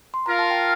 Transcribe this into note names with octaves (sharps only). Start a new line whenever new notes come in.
C6
F4 A#4 F5 A#5
A5
G5